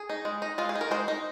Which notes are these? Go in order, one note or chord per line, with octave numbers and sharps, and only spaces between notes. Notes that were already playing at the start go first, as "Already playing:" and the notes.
Already playing: G#4
D#4
G#3
D#4
G#3 F4
G#4
D#4
A#4
G#3 C5
D#4